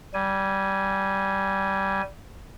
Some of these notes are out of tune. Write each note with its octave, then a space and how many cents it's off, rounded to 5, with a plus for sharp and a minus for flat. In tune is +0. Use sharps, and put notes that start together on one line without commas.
G3 -15 G#5 +0